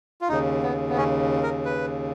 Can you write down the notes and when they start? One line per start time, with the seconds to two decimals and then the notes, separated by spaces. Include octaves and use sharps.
0.21 F4
0.29 D#2 C#3 D#4
0.63 B3
0.89 B3
0.97 C#4
1.43 A#4
1.65 B4